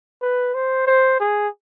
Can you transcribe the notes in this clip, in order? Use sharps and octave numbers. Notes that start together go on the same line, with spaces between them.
B4
C5
C5
G#4